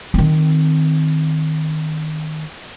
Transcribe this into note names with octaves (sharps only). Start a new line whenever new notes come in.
D#3 C4